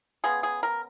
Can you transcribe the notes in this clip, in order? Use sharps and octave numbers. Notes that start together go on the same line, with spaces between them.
C#3 G#3 B3 G#4
G#4
A#4